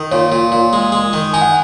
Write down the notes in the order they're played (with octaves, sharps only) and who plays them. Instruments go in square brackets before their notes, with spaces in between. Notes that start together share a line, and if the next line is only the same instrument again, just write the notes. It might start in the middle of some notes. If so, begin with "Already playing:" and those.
Already playing: [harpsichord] D#3
[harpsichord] A#2 [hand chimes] C#5
[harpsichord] A#2
A#2
G#3
G#3
D#3
[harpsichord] D#4 [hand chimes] G#5
[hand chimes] F#5